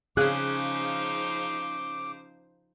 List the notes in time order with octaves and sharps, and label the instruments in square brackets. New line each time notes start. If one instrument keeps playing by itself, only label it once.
[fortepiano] C#3 C#4 F#6 [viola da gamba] F3 D#4 C5 [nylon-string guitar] G#4 [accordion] D6